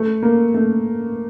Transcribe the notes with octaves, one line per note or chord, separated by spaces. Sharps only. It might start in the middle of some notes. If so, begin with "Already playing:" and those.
Already playing: A3
A#3
A3